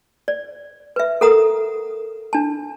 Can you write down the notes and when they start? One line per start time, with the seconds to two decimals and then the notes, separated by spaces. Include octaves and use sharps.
0.28 D5
0.96 B4 E5
1.21 A4 A#4 F#5 A#5 D#6
2.33 D4 A5